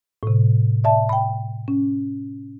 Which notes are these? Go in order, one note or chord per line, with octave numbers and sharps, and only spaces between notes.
A2 C3
D5 E5 A5
G5 B5
C#4